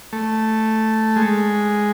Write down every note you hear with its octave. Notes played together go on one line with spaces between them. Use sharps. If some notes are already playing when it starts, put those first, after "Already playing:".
A3
G#3